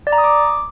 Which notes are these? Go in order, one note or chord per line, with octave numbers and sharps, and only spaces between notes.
D5
A#5
D#6
D6